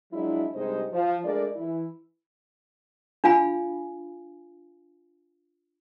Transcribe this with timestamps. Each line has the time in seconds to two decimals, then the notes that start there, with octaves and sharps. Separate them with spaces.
0.12 F3 F#3 G#3 D4 E4
0.54 G2 C3 G#3 D#4 C5 D#5
0.92 F3
1.24 G#3 A3 D4 A#4 D5
1.56 E3 E4
3.24 D4 F4 F5 G#5 B5